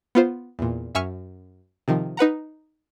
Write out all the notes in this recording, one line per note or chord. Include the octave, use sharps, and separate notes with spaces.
B3 F4 C5
E2 A#2
F#2 E5 G#5 C#6 F6
C3 D#3 F3
D#4 B4 F#5 A#5